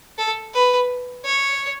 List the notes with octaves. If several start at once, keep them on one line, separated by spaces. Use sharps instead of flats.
A4
B4
C#5